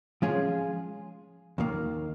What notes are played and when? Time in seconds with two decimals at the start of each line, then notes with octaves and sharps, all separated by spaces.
0.22 F3 G#3 C#4 F4 G#4
1.58 D#2 D#3 A#3